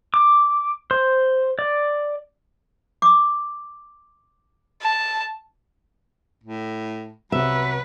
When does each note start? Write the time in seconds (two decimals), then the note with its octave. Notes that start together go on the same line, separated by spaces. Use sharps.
0.14 D6
0.91 C5
1.59 D5
3.02 D6
4.82 A5
6.44 A2
7.32 C2 C3 F#3 B4 E5